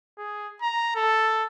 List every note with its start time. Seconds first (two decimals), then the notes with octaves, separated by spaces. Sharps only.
0.18 G#4
0.62 A#5
0.95 A4